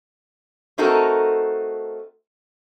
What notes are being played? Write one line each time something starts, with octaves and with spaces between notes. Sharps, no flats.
A3 C4 D#4 F#4 A4 A#4